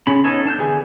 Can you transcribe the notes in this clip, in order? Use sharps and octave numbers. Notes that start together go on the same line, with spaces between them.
C#3 C#4 B5
B3 C#4 D#4 A4 C#5
D4 A5 F6 G6
D3 E3 B3 G#4 G#5